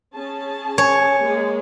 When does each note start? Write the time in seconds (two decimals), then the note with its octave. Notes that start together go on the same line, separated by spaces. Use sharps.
0.17 C#4 G#4 A5
0.78 C#5 G#5
1.24 G#3 A#3 G#4